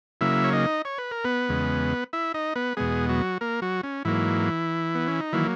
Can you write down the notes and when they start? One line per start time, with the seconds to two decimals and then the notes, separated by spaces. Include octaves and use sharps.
0.21 C#3 F#3 A#3 E4 E5
0.44 C#5
0.53 D#4 D#5
0.85 C#5
0.98 B4
1.11 A#4
1.24 B3 B4
1.49 E2 C#3 G#3
2.13 E4 E5
2.34 D#4 D#5
2.56 B3 B4
2.77 E2 B2 G#3 B3 G#4
3.09 F#3 F#4
3.41 A#3 A#4
3.62 F#3 F#4
3.83 C#4
4.05 G#2 E3 F#3 A#3 E4
4.95 B3
5.08 C#4
5.20 D#4
5.33 D#3 E3 F#3 A#3 E4